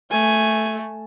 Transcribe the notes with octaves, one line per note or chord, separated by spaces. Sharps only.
A3 G#5